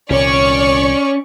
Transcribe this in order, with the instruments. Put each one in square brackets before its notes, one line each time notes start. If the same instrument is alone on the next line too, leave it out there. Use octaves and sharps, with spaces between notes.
[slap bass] C2 A#2 D#3 [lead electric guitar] C#4 [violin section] C#5 D5 C#6